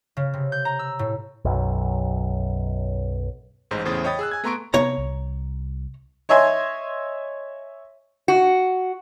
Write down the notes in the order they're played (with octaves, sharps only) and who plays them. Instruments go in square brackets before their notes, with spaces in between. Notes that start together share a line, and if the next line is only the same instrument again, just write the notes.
[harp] C#3
C3
G6
A#5
E6
A2
[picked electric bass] B1 F#2
[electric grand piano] A1 G#2 C5
E2 A2 C#3 C5 D#6 A6
C#5 D#5 G5 B5 D#6 A6
G#4 E6 F#6
G#5 G#6
A3 B3 A#5 C6 C#6 D7
[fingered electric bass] C3 A#3 B3 [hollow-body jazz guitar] C#5 A#5
[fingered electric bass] C2
[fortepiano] C#5 D#5 E5 G#5 C6
[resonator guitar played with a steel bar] F#4